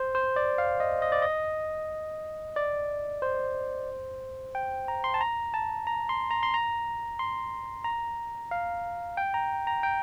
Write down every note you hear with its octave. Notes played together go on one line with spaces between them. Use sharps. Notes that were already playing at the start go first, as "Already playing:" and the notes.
Already playing: C5
C5
D5
F5
D#5
D#5
D5
D#5
D5
C5
G5
A#5
C6
A5
A#5
A5
A#5
C6
A#5
C6
A#5
C6
A#5
F5
G5
A#5
A#5
G5